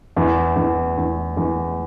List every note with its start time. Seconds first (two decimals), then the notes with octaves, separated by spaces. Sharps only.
0.16 E2
0.56 E2
0.97 E2
1.37 E2